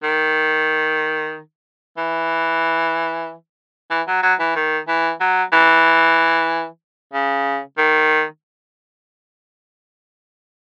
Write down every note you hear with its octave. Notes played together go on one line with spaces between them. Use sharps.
D#3
E3
E3
F#3
F#3
E3
D#3
E3
F#3
E3
C#3
D#3